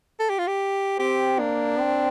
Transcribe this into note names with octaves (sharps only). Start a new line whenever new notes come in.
A4
G4
F4
G4
C4 G4
A#3 D4
C4